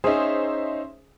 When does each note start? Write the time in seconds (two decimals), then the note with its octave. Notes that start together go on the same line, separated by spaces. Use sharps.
0.04 C#4 D#4 G#4 C5 E5